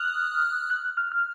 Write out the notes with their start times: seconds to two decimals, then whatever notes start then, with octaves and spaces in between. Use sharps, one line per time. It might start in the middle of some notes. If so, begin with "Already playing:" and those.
Already playing: D#6 F6 F#6
0.70 F#6
0.97 F6
1.12 F6